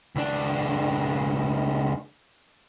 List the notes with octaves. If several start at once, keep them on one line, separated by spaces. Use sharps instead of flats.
C#2 D4